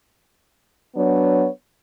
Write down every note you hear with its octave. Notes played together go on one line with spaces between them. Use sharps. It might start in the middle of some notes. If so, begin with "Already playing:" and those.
F#3 B3 D4 C#5